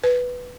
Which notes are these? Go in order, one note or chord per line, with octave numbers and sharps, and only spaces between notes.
B4